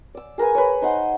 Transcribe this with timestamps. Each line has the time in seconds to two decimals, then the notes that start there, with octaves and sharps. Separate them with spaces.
0.14 D5 E6
0.38 G#4 A#4 B4 G#5
0.55 B4 C#5
0.82 D#4 C5 F#5 C6